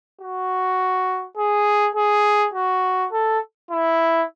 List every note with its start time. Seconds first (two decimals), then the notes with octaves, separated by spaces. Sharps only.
0.21 F#4
1.37 G#4
1.95 G#4
2.54 F#4
3.12 A4
3.71 E4